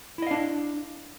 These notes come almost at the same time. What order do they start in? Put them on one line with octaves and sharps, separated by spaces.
E4 D#5 F5 D4